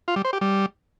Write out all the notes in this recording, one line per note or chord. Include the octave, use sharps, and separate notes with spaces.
F4
G3
C5
G4
G3